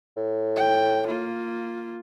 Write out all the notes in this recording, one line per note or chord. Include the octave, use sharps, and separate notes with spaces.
A2
G5
A#3 F4